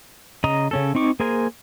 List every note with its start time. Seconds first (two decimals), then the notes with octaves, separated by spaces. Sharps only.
0.44 C#3 D#5 A#5 D#6
0.71 C#3 C#4 A4
0.95 C4 D#4 C#6 D6
1.20 A#3 G#4 A#4 C5 G#5